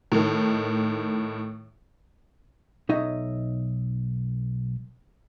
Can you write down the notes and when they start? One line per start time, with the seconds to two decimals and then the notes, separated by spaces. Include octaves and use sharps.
0.12 A2 D#3
2.89 B1 D#4 C#5 D#5 E5